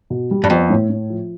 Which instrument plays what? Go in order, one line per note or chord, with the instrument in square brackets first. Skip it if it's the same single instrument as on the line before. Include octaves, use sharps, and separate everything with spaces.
[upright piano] B2
G3
[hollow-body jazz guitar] G2
[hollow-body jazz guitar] F2 [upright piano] B3
[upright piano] A2
A2
F3